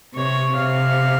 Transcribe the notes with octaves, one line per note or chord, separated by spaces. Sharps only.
C3 C#5
C3 F5